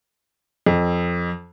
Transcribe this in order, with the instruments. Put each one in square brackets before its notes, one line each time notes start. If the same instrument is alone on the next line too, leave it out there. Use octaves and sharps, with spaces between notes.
[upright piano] F2